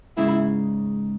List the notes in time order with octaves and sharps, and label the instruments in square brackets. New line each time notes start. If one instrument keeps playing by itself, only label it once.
[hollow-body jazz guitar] G#2 C#3 [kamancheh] E4